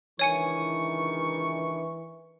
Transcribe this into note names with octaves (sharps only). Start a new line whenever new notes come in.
C#2 D#3 E3 D4 C#5 G#5 C#6 C#7